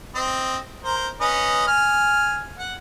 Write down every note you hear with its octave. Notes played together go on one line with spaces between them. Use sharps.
C4 D#5
A#4 C5
C#4 B4 D#5
G#5 F6
F#5